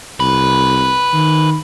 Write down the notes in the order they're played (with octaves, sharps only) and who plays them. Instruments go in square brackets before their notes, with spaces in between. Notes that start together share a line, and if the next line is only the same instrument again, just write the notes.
[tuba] C2 [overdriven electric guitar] B4
[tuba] D#3